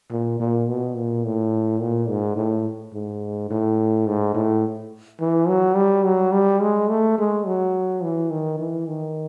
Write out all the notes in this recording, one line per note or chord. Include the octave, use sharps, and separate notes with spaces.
A#2
A#2
B2
A#2
A2
A#2
G#2
A2
G#2
A2
G#2
A2
E3
F#3
G3
F#3
G3
G#3
A3
G#3
F#3
E3
D#3
E3
D#3